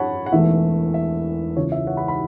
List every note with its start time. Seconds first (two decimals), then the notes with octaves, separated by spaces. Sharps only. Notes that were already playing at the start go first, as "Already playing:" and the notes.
Already playing: F#2 C#5 F#5 A5 B5 C#6
0.26 F#5
0.32 E1 E2 E3 A3 E5
0.94 E5
1.57 C#2 C#3 E3 C#5
1.72 E5
1.87 C#5 F#5
1.97 F#5 B5
2.08 F#5 B5